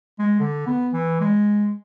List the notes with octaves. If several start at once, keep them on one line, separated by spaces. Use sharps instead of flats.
G#3
D3
B3
E3
G#3